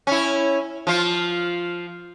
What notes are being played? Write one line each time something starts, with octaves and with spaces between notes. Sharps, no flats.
C#4 E4
F3 F4